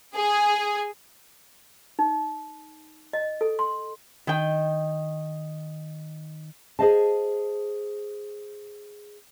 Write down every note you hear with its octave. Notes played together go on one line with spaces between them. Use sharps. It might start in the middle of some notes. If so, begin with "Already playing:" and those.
G#4
D#4
D#5
A4
C6
D#3 G5
G#4 A4 C5 D#5 F5 A5